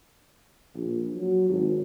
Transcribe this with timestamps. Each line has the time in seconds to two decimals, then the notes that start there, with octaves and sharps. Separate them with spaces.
0.75 A#1
1.15 F#3
1.49 G#1